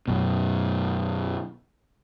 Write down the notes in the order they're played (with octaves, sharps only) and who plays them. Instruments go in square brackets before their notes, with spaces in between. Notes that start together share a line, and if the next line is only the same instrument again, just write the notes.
[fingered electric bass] F#2 B2